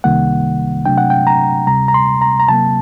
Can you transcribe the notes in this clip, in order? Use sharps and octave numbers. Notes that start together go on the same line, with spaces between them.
C2 C3 D#3 G3 A#3 F#5
C3 F#3 A3 D4 G5
F#5
G5
A#5
D2 C3 G3 A#5
A#5
C6
A#5
A#5
C3 F#3 A#3 A5